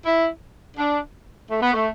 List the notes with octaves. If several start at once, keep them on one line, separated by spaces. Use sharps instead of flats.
E4
D4
A3
B3
A3